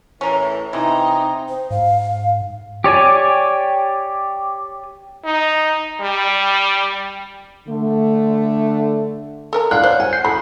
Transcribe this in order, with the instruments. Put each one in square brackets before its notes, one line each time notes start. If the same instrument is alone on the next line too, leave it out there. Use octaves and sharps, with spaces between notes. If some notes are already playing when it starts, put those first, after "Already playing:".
[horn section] A2 E3 [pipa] C#4 A#4
[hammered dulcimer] C3 G#5 [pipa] E3 [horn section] D#4 [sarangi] A#5
[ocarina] C5
[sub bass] G#2 [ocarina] F5
[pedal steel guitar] G4 C#5 D5 G#5
[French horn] D#4
G3
[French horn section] D3 A3
[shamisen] A4 A#4 A#5
[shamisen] D3 [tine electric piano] D5 F5 F#5 [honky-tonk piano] F#6
[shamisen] C5 C#5
[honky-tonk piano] F#5 [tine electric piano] G#5
[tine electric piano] G6 C7
[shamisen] F3 A4 [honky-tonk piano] B5